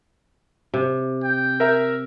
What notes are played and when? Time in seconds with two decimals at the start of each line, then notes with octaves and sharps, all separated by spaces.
0.74 C3
1.23 G5
1.60 A#4 E5 A#5